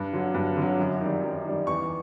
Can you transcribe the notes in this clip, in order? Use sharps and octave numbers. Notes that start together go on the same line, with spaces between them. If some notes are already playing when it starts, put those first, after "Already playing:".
Already playing: G2
D3 F#3
G2
D3
F#3
F#2
D#3 G3
F#2
D#3 G3
E2 C#6